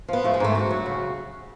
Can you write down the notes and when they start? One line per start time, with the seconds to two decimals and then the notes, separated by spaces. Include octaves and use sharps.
0.08 F3 B3
0.24 F3 A3
0.34 G#3
0.40 G#2 A3
0.55 D3 F#4
0.70 F#3
0.86 C#3